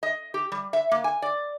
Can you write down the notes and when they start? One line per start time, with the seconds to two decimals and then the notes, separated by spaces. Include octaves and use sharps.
0.03 D#5
0.34 G4
0.52 G3
0.73 E5
0.91 A#3
1.04 G#5
1.22 D5